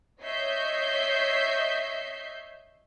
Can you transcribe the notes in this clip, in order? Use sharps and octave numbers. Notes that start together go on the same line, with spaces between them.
C#5 D#5 E5 G6 C7